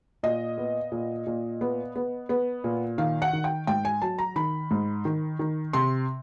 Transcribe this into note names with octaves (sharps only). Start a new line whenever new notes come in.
A#2 D#5
B3
A#2
A#2
B3
B3
B3
A#2
D#3 F5
F#5
D#3
G5
G#2 G5
G#5
F#3 A5
A#5
D#3 B5
G#2
D#3
D#3
C3 C6